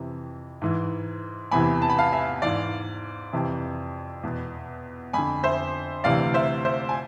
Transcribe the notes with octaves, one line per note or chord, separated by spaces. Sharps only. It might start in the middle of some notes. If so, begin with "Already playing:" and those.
Already playing: F2 C3 E3
G#2 E3
E2 C3 E3 G#5 B5
A5
B5
F5 A5
E5 G#5
G#2 E3 D5 F5
F2 C3 E3
E2 B2
F2 D3 G#5 B5
C5 E5
D2 C3 E3 D5 F5
C5 E5
C5 E5
G#5